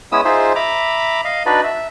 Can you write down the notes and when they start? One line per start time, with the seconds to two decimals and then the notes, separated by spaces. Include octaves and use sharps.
0.12 G#3 B3 C#4 E4 D#6 E6
0.25 D#4 F4 G#4 C5 E5
0.56 E5 A#5 B5 D6
1.25 D#5 F5
1.46 D4 D#4 F#4 B4 D5
1.64 E5